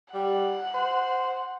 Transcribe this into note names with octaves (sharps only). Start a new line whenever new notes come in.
G3 F#5
C5